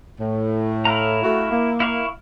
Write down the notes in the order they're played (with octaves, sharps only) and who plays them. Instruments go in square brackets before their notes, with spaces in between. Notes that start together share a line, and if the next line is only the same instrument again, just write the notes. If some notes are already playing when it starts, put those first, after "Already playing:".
[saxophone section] A2
[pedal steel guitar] E4 F5 A#5
[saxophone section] A3 F#4
A#3
[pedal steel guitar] E4 F5 C#6